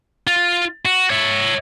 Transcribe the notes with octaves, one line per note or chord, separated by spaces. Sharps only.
F4
F#4
C#5 E5